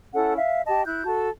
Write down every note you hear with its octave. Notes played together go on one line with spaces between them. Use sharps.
C#4 E4 A4 F#5
E5 F5
G4 D#5 A5
E4 F#6 G6
F#4 A4 A5